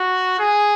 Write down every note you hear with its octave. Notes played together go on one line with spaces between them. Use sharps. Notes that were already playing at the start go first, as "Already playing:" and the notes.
Already playing: F#4
G#4